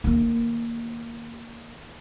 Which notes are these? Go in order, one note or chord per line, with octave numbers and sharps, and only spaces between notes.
D#3 A#3